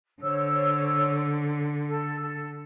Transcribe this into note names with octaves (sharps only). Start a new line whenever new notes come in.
D3 C5 C#5 E6
A4
A4